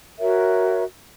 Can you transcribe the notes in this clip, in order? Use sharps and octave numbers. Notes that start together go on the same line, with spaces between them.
F#4 A#4 C#5 E5